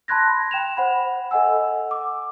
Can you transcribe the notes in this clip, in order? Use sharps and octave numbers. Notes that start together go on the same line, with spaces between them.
A5 B5 C6 F#6 G#6 A#6
G5 E7 F7
C5 F#5 B5
A4 D#5 F#5 G#5 E6
D6